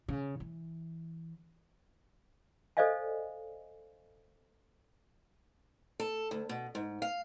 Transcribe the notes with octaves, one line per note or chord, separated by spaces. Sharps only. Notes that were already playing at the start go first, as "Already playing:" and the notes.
C#3
E3
A4 C5 D5 D#5 F5 G#5
A4
D2
B2
G#2
F5